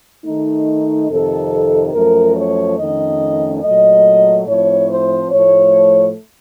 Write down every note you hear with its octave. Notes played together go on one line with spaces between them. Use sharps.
D#3 A3 D#4
F2 C3 D#3 A4
F#2 F3 A3 A#4
C#5
F2 D#3 A3 C#4 D#5
A#2 F#3 A3 D#5
A2 F3 C4 C#5
C5
A2 F3 A3 C#5